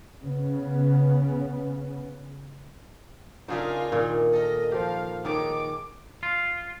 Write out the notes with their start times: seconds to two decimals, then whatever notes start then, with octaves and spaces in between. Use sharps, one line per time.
0.21 C#3 B3
3.48 C#3 D4 D#4 F4 G#4 A#4 E5 G#5
3.92 A#2 D#3 G4
4.33 A4 A#4 D#5
4.72 F3 G4 F5
5.25 D#3 G#3 D#4 C#5 A5 D6
6.23 F4